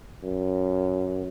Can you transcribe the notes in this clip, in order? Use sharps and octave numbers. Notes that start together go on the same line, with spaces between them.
F#2